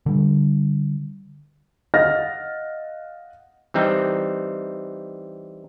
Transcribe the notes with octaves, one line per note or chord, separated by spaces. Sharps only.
D3 G3
D#5 F5 F#5 F6 A6 A#6
E3 G3 C4 D#4